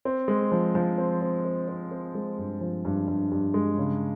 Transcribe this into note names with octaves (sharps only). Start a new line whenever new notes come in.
C4
G#3
F3
F3
C4
C4
C4
C4
C4
G#3
G2
F3
G2
G2
G2
G#3
C#3